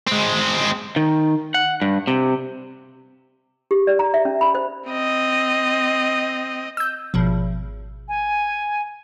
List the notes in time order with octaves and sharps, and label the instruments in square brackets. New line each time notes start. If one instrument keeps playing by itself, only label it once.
[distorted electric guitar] G#3 C4
[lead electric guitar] D#3
F#5
G2
C3
[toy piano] G4
D5
A#5
E5
C#4
B5
C5
[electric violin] C4 D#5
[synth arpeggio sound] E6 G6
G#1 B2 F3
[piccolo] G#5